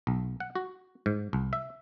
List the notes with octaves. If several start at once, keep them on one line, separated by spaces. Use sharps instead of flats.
B1
F#5
F#4
G#2
C2
E5